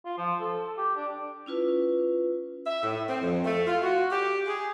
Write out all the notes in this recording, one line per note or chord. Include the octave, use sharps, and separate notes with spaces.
F4
F3
A4
G4
D4
C#4 E4 F4 B4
E5
A2
C4
F2
A3
F4
F#4
G4
G#4